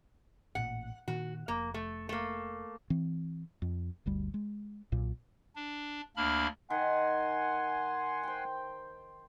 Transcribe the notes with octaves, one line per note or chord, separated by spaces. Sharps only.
A1 A#2 F#5
A#2 D#3 F#4
F1 A#3
A3
A3 A#3
E3 C4
F2
G1 D2 G3
G#3
B1 A#2
D4
D2 A#3 D4 B5 F6
D#3 F#5 G#5 C6
C5 G5